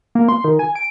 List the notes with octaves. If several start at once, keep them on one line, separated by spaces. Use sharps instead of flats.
A#3
C6
D#3
G#5
D7